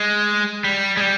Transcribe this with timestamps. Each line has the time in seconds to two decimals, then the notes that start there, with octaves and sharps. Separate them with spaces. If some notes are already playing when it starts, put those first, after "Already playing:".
Already playing: G#3
0.64 G3
0.97 G#3
1.01 G3